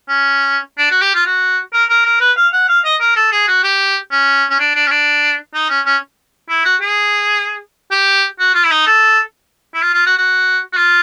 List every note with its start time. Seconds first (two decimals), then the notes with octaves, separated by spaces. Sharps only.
0.09 C#4
0.78 D4
0.90 F#4
1.02 G4
1.14 F4
1.26 F#4
1.73 A#4
1.89 A#4
2.05 A#4
2.21 B4
2.37 F5
2.53 F#5
2.68 F5
2.84 D#5
3.00 A#4
3.16 A4
3.32 G#4
3.48 F#4
3.63 G4
4.11 C#4
4.50 C#4
4.59 D4
4.75 D4
4.86 C#4
4.91 D4
5.54 D#4
5.70 C#4
5.86 C#4
6.49 E4
6.65 F#4
6.81 G#4
7.91 G4
8.39 F#4
8.54 F4
8.64 E4
8.71 D#4
8.87 A4
9.74 E4
9.82 F4
9.93 F4
10.06 F#4
10.17 F#4
10.73 F#4
10.77 F4